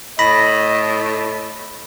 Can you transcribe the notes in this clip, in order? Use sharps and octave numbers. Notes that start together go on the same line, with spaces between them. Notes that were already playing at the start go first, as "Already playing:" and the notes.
A2 D#5 B5 A#6